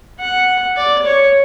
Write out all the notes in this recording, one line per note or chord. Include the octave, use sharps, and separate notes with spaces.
F#5
D5
C#5